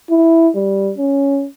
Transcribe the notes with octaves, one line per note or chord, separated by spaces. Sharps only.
E4
G3
C#4